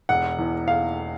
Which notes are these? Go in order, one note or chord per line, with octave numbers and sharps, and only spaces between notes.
E1 F#5
E2
E1 F5